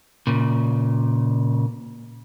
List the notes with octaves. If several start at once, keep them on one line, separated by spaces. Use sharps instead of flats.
A#2 C#3